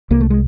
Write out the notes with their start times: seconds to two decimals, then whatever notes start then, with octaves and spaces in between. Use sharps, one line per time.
0.11 C2 A#3
0.21 A3
0.30 G#3